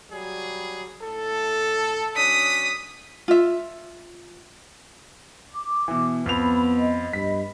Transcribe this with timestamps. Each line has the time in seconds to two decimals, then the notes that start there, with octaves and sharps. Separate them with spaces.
0.10 F#3 G3 G#4
1.02 A2 A4
2.16 F#3 C#4 D4 D#6 B6
3.28 F4 E5
5.50 D6
5.88 B2 E3
6.26 F2 B3 B5 F7
6.77 D#5 B5
7.13 G2 B6